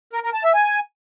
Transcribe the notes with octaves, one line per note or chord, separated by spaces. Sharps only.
A#4
A#4
A5
E5
G#5